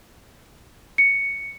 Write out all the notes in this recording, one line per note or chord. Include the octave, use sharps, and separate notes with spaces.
C#7